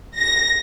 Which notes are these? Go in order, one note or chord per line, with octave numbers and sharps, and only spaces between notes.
A#6